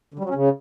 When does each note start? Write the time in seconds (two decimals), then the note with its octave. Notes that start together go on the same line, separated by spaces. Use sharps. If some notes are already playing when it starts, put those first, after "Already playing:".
0.14 D3
0.19 G3
0.24 F#3
0.29 C#4
0.34 C#3